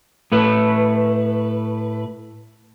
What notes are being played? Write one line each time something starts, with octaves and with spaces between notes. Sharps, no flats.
A2 A3 B4